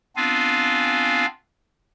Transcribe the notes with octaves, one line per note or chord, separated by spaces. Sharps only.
B3 C4 D4 F4 F5 G#5